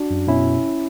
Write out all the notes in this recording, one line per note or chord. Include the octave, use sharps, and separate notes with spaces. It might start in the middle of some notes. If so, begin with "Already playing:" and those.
Already playing: D4 F#4
F#2
B2 C#4 E4